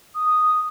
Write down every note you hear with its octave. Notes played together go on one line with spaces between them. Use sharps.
D#6